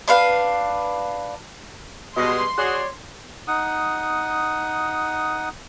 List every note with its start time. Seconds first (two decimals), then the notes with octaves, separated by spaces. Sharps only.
0.08 D4 B4 F5
2.17 B2 G3 G#3 D#5 C6
2.58 F#4 G#4 C#5 D5
3.48 D#4 F#5 D#6